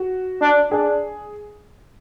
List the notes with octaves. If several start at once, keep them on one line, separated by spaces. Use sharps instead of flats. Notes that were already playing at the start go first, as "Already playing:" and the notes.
Already playing: F#4
D4
D4 G#4